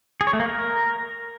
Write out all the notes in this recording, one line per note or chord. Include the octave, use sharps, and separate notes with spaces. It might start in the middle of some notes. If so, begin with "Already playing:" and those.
G#4
C#5
A3
A#3
A#4